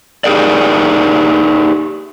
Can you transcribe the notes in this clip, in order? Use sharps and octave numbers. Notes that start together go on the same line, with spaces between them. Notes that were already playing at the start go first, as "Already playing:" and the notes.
D#4 G4 G#4 A#4 D5